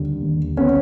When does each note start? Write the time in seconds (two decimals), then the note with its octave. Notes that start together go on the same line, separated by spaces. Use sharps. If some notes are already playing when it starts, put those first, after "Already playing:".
Already playing: D#2 D3 G3
0.22 D#2
0.57 B3 C#4